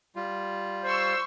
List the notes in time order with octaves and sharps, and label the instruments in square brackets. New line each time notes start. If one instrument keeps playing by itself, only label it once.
[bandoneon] G3 F4
[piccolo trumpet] C5 [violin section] C6 C#6 E6